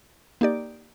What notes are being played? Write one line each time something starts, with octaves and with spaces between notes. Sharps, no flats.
A#3 D#4 G4 D5